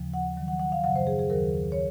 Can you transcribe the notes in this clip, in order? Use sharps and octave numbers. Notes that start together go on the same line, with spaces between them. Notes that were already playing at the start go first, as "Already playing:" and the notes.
Already playing: D#2 C#3 F3
F#5
D#2 D#3 F#3
F#5
F#5
F5
F#2 C#3 F#3 F#5
C5
G#4
G#4
D#2 D#3 F#3 A#4
C#5